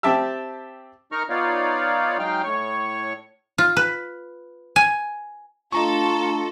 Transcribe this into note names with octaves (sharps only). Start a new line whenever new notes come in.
C4 G4 E5 A5 E6
D#4 A#4 A#5 C#6 F6
B3 D#4 F4 C#5 D5 F5
F#3 G#3 D#4 F5 G5 F6
A2 C#5 C#6
F4
B4
G#5
A3 D4 F4 A4 D#5 A#5 C#6 E6